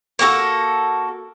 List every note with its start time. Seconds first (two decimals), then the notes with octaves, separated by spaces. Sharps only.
0.19 A#3 F#4 G4 A4